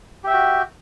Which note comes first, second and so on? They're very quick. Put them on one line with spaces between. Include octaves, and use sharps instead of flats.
G4 E5 G5 F#4